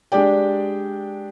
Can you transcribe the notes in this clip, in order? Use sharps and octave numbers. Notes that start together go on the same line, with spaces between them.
G#3 D4 G4 D5 G5